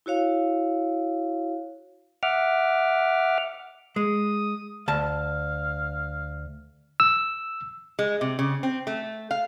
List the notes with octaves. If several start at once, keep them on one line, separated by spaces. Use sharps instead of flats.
E4 F#4 C#5 F5
E5 F#5 D6 F6
G#3 D#6
D2 F5 A5
E6
G#3
C3
C#3
C4
A3
F5